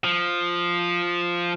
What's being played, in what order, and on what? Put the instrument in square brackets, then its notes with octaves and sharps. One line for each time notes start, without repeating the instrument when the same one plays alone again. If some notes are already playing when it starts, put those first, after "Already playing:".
[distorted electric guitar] F3